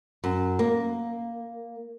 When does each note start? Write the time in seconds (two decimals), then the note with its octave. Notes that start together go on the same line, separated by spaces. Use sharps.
0.24 F#2
0.59 A#3